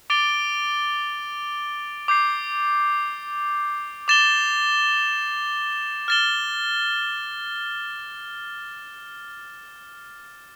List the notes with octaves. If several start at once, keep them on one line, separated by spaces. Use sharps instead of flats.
D6 A6 D7 G7
D6 G6 C7
D6 A6 E7 G7
F6 A6 E7 G7